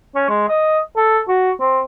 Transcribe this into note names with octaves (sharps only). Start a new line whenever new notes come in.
C#4
G#3
D#5
A4
F#4
C4